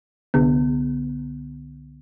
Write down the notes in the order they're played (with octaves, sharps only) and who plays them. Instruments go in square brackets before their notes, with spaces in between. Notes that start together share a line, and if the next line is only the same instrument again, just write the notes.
[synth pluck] C2 D3 B3